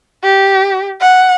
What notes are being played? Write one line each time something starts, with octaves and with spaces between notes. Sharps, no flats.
G4
F#5